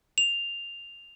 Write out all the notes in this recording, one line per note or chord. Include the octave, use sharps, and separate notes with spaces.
F7